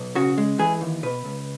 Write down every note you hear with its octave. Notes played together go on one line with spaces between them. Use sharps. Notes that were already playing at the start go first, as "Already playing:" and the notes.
Already playing: B1
C#3 F#4
G#3
E3 G#4
D#2
B2 B4
C#2